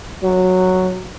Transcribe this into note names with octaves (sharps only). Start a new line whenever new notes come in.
F#3